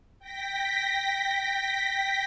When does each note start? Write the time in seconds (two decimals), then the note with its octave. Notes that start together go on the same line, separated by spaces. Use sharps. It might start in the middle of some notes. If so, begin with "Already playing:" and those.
0.19 G5 A#6 B6